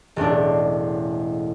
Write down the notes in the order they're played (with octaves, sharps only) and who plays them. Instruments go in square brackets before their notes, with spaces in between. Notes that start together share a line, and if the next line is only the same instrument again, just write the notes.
[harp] E1 A1 A2 D4